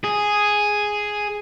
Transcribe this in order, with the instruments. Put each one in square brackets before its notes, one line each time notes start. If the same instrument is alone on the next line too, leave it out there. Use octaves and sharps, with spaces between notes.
[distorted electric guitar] G#4